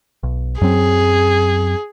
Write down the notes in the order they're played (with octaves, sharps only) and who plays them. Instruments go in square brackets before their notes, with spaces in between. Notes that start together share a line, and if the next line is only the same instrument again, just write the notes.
[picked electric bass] B1
[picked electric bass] F#2 F#3 C4 [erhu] G#4